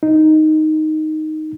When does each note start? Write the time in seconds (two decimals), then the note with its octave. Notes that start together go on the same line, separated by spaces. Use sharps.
0.03 D#4